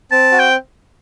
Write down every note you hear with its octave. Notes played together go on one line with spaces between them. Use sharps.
C4 A5
F#4
G5